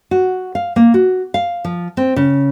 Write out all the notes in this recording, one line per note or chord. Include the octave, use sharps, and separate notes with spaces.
F#4
F5
A#3
F#4
F5
F3
C4
C#3